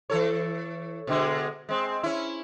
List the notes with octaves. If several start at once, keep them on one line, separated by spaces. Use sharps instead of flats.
E3 A4 C#5
B2 D3 G#3
G#3 C4
C#4 E4